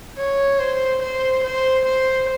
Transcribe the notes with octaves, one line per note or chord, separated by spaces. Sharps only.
C#5
C5
C5
C5
C5